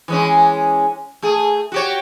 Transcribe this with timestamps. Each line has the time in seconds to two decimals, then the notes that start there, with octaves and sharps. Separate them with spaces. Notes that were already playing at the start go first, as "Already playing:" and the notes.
0.08 E3 G#3 C#4
1.22 A3 G#4
1.72 F#4 G4 C#5